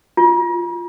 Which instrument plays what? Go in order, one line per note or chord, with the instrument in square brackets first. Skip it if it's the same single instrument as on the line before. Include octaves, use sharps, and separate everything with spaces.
[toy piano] F4